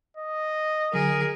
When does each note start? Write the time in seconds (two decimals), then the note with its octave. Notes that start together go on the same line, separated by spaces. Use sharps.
0.17 D#5
0.94 D3 F#3 G#4 A#4